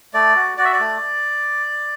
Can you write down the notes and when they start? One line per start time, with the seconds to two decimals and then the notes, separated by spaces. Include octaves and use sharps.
0.14 A3 D5
0.36 F#4
0.58 F#4 D5
0.65 E5
0.72 D5
0.80 A3